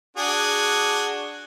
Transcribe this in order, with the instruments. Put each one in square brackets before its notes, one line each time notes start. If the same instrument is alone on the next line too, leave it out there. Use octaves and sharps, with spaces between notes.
[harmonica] D4 F#4 G#4